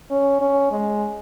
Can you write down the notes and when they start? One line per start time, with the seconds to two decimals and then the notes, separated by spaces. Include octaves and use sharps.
0.11 C#4
0.41 C#4
0.71 G#3